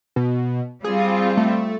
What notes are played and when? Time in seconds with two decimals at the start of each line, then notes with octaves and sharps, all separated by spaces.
0.16 B2
0.84 G3 C4 F4 G#4
1.37 A3